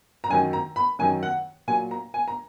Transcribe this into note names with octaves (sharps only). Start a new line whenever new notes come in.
A#5
F#2 D#3 F#3 G#5
A#5
B5
F#2 D#3 F#3 G#5
F#5
A#2 F#3 G#5
A#5
G#5
A#5